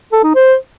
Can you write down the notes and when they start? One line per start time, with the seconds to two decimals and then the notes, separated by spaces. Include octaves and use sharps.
0.12 A4
0.24 D#4
0.35 C5